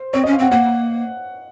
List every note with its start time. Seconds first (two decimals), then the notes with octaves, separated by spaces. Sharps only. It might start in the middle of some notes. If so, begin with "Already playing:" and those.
Already playing: C5
0.13 C4 C#5
0.24 C#4 D#5
0.33 F5
0.39 C4 F#5
0.52 A#3 F#5